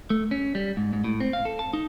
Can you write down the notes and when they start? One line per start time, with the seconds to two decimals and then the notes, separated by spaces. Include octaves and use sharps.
0.10 A3
0.31 C#4
0.55 G3
0.77 G#2
0.93 G#2
1.04 A2
1.20 C4
1.33 F5
1.45 A4
1.59 A5
1.73 D#4